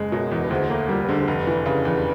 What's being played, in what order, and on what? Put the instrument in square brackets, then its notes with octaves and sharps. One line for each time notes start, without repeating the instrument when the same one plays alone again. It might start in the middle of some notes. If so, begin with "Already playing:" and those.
Already playing: [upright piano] F#1 G#3
[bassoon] F#2 [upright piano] B2
[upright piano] E2
[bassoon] G2
[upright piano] D2 [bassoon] G#2
[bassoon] A2 [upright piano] A#3
[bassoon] A#2 [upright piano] G3
[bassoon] G2
[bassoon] G#2 [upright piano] D3
[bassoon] G#2
[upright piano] F1 [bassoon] G2
[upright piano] E3
C#3
E2